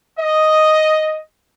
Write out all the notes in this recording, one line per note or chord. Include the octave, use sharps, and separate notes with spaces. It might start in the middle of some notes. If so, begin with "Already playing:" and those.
D#5